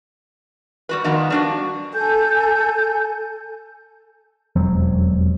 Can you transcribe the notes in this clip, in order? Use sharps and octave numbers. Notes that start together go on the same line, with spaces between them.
G3 F#4 B4
F2 D#3 B3 A#5
G3 D4 F#4
A4 G#5 G6
E1 F2 F#3 C4